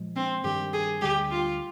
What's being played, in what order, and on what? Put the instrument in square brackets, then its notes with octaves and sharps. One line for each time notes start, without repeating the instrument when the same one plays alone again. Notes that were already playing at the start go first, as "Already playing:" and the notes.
Already playing: [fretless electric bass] A#2 F3 G#3
[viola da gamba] C4
[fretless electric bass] G2 D#3 G3 [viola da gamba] G4
[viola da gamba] G#4
[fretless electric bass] D2 D3 G3 [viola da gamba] G4
[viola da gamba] F4